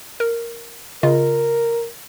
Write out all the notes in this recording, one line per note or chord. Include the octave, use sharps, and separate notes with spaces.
A#4
C#3 F4 A#4 D#5